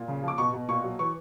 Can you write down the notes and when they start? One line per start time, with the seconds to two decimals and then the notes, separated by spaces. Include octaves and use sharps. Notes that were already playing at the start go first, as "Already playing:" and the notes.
Already playing: A#2
0.08 C#3
0.23 F3
0.28 D6
0.38 B2 C#6
0.53 B2
0.68 A#2 C#6
0.83 F#3
0.99 E3 C#6